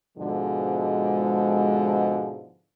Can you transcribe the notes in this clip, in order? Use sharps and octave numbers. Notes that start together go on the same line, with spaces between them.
G#2 B2 D3 F3 G#3